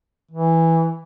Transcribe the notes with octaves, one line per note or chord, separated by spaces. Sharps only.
E3